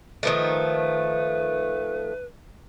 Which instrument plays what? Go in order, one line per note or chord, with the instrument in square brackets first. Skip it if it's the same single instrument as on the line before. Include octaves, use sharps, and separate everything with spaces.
[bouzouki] D#3 F3 A3 [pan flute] B4